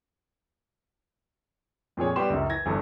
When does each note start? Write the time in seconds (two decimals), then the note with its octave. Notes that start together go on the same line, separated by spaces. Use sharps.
1.97 F2 A#2 G#4 C#5
2.16 G3 B3 G4 C6 E7
2.30 C#2 F#2
2.49 E3 G#6 A#6
2.66 G1 E2 G2 A4